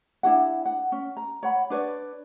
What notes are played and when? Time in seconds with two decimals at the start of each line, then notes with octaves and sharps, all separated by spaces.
0.23 D4 E4 F#4 F#5
0.66 F#5
0.92 C#4
1.17 A#5
1.43 C#5 F#5 B5
1.70 D4 B4 C#5 D5